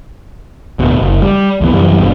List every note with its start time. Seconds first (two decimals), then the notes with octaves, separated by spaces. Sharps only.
0.79 D1 B2
1.02 F#1
1.22 G3
1.61 C#2 E3 B3
1.72 C2 F#2 E3 G3
1.98 F#1 G2 B2